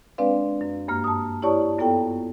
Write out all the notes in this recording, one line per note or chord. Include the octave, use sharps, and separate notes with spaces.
G#3 C4 D4 B4 D5 F5
F#2
G2 A#3 F6
A5 D#6
E4 G4 C#5 D5 A5 C#6
F#2 B3 F4 A4 G5